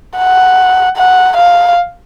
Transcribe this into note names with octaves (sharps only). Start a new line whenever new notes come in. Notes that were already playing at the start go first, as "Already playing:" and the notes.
F#5
F#5
F5